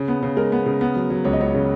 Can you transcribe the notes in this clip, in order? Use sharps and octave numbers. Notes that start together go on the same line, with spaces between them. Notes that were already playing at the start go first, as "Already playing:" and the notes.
Already playing: C#3
B3
C#3
G#3 A#4
B3
C#3
B3
F#3
F#3
C#2 C#5
D#5
C#2 C#5
C#3